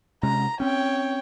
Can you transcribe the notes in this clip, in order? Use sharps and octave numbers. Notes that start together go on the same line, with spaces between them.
C3 G#3 C#4 A#5
C4 C#4 C#5 G5